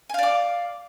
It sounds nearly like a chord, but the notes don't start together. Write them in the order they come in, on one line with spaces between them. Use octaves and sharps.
G#5 F5 D5 D6